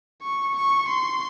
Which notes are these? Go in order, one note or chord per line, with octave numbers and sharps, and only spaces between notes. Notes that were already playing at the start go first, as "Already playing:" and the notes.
C#6
C#6
C6